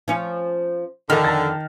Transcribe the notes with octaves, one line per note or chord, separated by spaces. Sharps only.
F3 C#4
F2 D3 D#3 G#4 F6
A5 A6